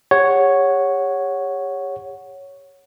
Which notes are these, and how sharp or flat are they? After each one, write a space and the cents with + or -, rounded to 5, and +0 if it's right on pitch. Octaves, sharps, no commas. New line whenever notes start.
G4 +40 C#5 +0 F#5 +0